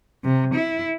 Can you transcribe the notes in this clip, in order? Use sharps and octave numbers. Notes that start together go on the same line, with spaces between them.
C3
E4